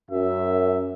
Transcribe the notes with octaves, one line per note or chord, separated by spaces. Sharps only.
F#2 E5